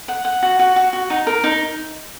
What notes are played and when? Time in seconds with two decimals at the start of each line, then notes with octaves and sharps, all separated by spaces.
0.08 F#5
0.25 F#5
0.43 F#4
0.59 F#4
0.76 F#4
0.93 F#4
1.10 D#4
1.27 A#4
1.44 D#4